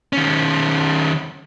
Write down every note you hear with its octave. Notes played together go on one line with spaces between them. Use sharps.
D#3 C#4